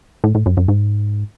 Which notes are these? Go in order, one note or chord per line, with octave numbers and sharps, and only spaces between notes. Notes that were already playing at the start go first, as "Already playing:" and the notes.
A2
A2
F#2
F#2
G#2